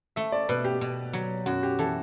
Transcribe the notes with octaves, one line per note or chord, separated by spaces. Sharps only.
A3 E5
D5
B2 B4
G4
B2
F#3
F#2 F#4
G4
E3 A4